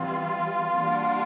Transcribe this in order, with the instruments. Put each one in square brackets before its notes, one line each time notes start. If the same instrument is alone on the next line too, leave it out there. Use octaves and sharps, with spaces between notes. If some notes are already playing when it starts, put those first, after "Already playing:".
Already playing: [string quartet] C3 E3 G3 B3 [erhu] F4
[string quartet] E3 G3 A#3 D4 F#4